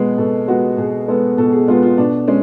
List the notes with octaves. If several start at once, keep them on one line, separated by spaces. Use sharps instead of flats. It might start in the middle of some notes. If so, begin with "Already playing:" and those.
Already playing: B2 G#3 B3 G#4
B2 A4
G#3 B3 F#4
B2 G#4
G#3 B3 A4
B2 A4
G#4
G#3 B3 F4
F4
B2 D4
G#3 C#4